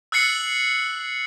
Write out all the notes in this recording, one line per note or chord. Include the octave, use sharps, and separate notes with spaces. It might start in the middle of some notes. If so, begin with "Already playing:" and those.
E6 F#6 A6 C7 C#7 F#7